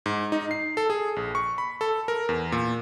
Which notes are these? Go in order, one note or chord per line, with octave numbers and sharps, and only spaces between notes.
G#2
D#4
C7
A4
G#4
A#1
C#6
B5
A4
A#4
E2
A#2